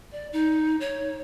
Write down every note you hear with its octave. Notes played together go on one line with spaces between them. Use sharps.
D5
D#4
C#5